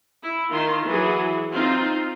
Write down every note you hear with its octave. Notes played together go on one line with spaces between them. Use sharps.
E4
D#3 F4 C6
E3 F#3 G#4
C4 D#4 F4